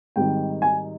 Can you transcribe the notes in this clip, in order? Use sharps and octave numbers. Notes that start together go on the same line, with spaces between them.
G#1 G#2 D#3 G3 G5
G#5